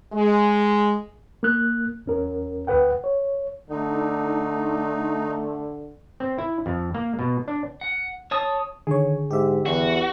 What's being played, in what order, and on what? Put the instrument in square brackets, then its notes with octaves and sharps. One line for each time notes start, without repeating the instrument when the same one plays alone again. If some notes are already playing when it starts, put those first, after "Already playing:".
[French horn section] G#3
[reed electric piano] A#3 F#6
E2 C#4 A#4
D2 B4 F#5 G5
C#5
[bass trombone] D3 [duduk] A3 [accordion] D#4
[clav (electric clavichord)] C4
E4
F2
A#3
B2
D4
[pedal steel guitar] F#5
C#5 A5 D#6
[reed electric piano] D3 G#4 [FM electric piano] D#3 C#5
[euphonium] G#2 [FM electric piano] G4 E5
[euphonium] E2 [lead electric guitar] F#4